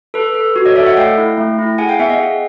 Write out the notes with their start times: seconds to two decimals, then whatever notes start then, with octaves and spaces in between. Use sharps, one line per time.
0.14 A4 B4
0.34 A4 B4
0.56 F#4
0.65 C#5 D#5
0.76 A4 D5 E5
0.86 E5 F#5
0.97 A3 F5 G5
1.18 E4
1.38 A3
1.59 E4
1.78 G#4 F#5 G#5
1.89 F5 G5
1.99 B3 E5 F#5
2.09 D#5 F5
2.20 G#4